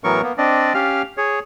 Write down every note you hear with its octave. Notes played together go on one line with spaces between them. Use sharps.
A2 E3 F#3 B3 A#4 C#6
A#3 B3
C4 D4 D5 D#5
C#4 G4 F5 F6
G#4 C#5